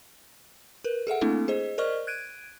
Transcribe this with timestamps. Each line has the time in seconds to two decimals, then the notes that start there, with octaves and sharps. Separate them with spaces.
0.84 A#4 B4
1.07 G#4 A4 E5 F#5
1.21 A3 A#3 C4 D4 E4 A4
1.48 G#4 C5 D#5
1.78 A#4 C5 D5 D#5 C#6 F6
2.07 F#6 G#6 D7 D#7